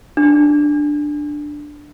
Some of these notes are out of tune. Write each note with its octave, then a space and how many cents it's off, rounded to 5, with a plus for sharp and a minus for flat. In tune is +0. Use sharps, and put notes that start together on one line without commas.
D4 +10